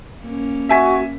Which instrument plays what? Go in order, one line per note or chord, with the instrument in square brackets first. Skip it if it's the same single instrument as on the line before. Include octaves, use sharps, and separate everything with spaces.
[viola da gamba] A#3 C#4
[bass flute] F#4 [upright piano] E5 G#5 B6